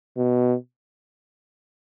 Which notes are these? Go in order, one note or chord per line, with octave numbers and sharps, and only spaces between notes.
B2